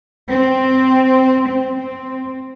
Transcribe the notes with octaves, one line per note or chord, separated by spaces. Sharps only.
C4
C4
C4